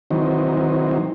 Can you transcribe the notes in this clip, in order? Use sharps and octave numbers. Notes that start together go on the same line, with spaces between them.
D#3 E3 F#3 C4 D#4